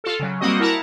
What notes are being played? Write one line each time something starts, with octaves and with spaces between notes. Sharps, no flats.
F4 A4
C#3 F#3
G3 A#3 C4 F#4 D#5
E4 A#4 F#5 A5 A#5